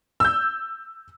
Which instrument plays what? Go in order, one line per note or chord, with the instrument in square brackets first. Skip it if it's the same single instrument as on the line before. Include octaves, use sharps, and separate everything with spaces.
[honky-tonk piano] E6 G6